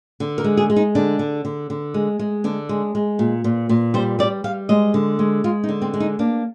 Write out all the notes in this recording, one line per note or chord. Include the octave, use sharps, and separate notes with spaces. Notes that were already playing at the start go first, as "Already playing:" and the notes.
D3
A#4
G#3
G#4
G#3
D#4
D3 D4
D3
D3
D3
G#3
G#3
D3 D4
G#3
G#3
A#2
A#2
A#2
G3 C5
G3 D5
G3 F5
G#3 D#5
D3
G#3
G#3 F4
D#4
D3
C4
G#3
D#4
A#3 D4